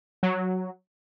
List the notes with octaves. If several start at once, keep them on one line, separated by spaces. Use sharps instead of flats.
F#3